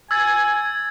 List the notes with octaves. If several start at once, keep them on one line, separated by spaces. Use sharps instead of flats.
G#5 E6 G#6 A6